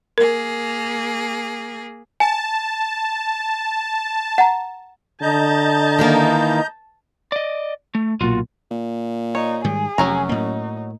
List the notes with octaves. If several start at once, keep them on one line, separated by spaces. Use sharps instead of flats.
A#3 G#4 A#4
G#5 A5
F#5 A#5
D3 D#5 A5 A#5 G6
D#3 E3 A#3
D5 D#5
A3
B1 A#2 F4 F#4
A#2
D#4 C#5
G#2 D#3 G3 G#4
F1 F#2 F#3 C#4 A#5
A2 A#3 D#4